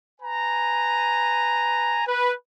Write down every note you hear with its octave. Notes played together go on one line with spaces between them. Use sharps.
B4 G#5 A#5
B4